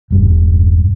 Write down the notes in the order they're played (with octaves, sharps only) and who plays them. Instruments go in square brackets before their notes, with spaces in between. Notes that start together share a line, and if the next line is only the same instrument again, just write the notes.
[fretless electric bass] E1 G2